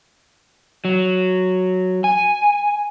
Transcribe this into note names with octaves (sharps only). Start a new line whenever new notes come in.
F#3
G#5